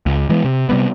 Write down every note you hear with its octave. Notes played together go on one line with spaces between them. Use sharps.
C#2
E3 G#3 A3 B3
C3
C3 G3 B3